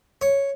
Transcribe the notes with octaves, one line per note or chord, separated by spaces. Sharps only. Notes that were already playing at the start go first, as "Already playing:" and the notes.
C#5